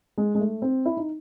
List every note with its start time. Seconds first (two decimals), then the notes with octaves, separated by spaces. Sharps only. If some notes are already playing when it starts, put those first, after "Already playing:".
0.18 G#3
0.35 G#3
0.40 A3
0.62 C4
0.86 E4
0.97 D#4